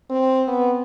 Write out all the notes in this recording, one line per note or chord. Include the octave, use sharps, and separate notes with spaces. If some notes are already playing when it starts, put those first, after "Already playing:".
C4
B3